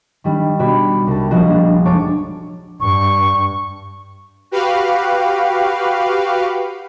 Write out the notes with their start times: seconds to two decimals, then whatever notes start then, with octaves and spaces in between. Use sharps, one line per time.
0.24 D#3 G3 D4
0.59 B2 F#4 G4 D5 B5
1.07 C2 A5
1.31 A#1 F3 G3 F#4 D#5
1.48 A#3 D4
1.85 F1 G#3 C#5 A5 D6
2.80 G2 C#6
4.51 F#4 G4 B4 F5